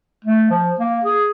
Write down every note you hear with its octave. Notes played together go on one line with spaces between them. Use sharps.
A3
F3
A#3
G#4